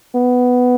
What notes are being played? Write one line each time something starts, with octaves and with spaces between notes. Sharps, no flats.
B3